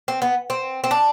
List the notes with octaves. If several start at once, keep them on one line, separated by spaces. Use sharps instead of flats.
C4
B3
C4
C4
D4